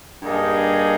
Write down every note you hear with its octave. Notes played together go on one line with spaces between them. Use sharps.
G2 G3 A#3 D#4 G#4